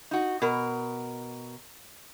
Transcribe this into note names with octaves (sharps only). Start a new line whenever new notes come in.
D#4 F#4
B2 A#4